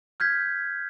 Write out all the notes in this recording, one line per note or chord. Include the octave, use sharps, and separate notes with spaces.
F6 G6 G#6 B6